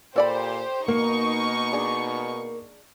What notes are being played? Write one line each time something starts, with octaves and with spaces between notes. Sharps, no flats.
A#2 G4 A4 C5 D5 B5
B2 A#3 D#4 C#6
D4 G#4